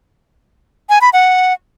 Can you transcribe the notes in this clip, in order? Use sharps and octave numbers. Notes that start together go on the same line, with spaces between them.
G#5
B5
F#5